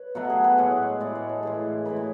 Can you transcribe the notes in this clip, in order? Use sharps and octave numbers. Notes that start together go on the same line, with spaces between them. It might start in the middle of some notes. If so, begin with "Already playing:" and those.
Already playing: B4 C#5
B2 F#3 A3 F#5
G#4
B4
A2 G#3 C#5
A2 G#3 D5
C#5
A4
A2 E3 G#3 G#4
A2 E3 G#3 B4
C#5